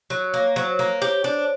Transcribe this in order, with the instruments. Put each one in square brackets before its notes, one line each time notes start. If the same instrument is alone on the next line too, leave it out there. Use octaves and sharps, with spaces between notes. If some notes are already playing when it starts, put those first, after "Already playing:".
[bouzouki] F#3 [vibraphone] C#5
[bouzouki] A#3
[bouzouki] F#3 [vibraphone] C5
[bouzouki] A#3
G4
D4